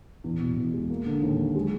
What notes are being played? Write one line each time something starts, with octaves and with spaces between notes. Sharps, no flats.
E2
B2
E2
G#3
A#3
D3
D#2
F#3
G#3